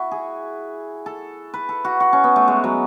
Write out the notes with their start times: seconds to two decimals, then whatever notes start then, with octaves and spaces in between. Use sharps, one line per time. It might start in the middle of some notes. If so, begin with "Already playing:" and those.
Already playing: E4 F#4
0.11 G#4
1.06 A4
1.54 B4
1.69 A4
1.85 F#4
2.00 F#4
2.13 C#4
2.24 B3
2.36 A3
2.48 G#3
2.64 F#3